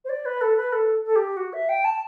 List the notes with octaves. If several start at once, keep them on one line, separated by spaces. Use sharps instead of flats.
C5
D5
B4
A4
B4
A4
A4
G4
F#4
E5
G5
A5